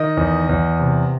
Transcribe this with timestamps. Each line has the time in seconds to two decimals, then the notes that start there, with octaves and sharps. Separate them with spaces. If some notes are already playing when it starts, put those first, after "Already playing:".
Already playing: D#3 D#5
0.17 E2
0.49 E2
0.80 C3